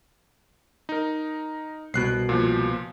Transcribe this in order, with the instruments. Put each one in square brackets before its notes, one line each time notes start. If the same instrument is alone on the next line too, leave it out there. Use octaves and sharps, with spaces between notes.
[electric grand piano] D#4 A#4
[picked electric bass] C2 B2 [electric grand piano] F#6 C7
[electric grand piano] A#2 F3